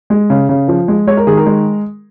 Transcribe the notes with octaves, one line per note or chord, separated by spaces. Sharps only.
G#3
C#3
C#3
F3
G#3
G#3 C#5
A#4
D#3 G#4
A#4
G#3